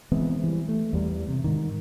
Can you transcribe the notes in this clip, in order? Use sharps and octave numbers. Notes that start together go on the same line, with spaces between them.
E3 G#3 B3 C4
E3 G3
A3
E2 G3
C3
G#2 D#3